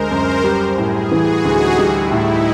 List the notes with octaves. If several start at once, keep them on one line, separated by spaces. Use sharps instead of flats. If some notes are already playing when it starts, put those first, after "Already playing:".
Already playing: D2 G#3 A#4 C5
F#2
G3 B4
A2 G#4
E3 F#4
D2 D#4
G3 E4
A2 D#4